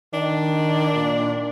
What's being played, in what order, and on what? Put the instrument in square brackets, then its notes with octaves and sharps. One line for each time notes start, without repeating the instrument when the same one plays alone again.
[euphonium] D#3 [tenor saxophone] D4
[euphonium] A#2